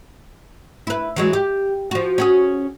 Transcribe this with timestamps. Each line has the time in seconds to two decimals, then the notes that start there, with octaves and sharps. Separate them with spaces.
0.87 E4 B4
1.16 E3 F#3 G#3
1.33 G4
1.91 F3 F#4
2.18 C#4 F#4 G#4